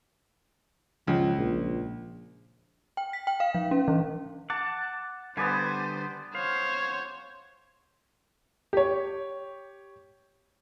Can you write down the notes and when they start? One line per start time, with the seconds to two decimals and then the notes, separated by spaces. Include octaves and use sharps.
1.07 C#2 F3
1.38 A#1
2.97 G5
3.13 B6
3.27 G5
3.40 F5
3.55 F3
3.71 C#4
3.88 E3
4.50 F#5 A5 D6
5.37 D3 G3 B3 B4 C5 D5 G#5
6.35 C5 C#5 F5
8.73 G4 C#5